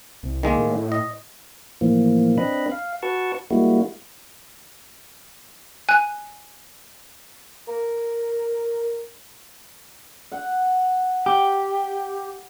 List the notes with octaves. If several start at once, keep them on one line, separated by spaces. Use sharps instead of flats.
C2
D#3 G#3 A#3
A2
D#5
A2 E3 F3 A#3
C4 D4 B4 D#5 B5
F5
F#4 B4 A5 C#6
G3 G#3 A#3 E4 F#4
G#5 F#6
A#4
F#5
G4